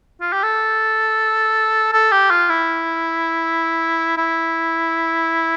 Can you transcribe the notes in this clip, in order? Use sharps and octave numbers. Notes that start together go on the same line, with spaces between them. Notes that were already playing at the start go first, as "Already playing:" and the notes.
F4
G4
A4
A4
G4
F4
E4
E4